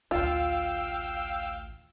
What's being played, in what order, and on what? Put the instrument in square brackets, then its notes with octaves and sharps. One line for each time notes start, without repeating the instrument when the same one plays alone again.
[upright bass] A1 D2 [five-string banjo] F4 [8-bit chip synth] F5 G5 E6